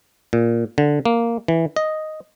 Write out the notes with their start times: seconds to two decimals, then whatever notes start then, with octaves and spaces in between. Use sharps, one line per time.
0.33 A#2
0.78 D3
1.05 A#3
1.48 E3
1.76 D#5